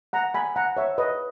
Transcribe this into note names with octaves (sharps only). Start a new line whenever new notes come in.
F#5 A#5
G#5 B5
F#5 A#5
C#5 E5
B4 D#5